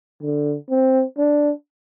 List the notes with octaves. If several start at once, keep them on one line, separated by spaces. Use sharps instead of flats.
D3
C4
D4